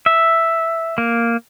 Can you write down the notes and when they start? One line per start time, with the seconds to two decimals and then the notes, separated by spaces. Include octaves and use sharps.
0.06 E5
0.98 A#3